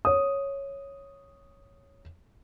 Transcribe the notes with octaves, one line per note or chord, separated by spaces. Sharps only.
C#5 D#6